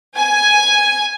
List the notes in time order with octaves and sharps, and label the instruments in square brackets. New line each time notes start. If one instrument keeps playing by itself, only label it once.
[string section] G#5